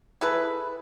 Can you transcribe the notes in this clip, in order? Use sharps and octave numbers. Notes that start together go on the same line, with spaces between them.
E4 G#4 A4 B4